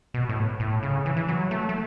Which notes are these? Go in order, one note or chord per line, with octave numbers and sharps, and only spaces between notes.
B2
A2
A2
C#3
E3
E3
F#3
A3
A3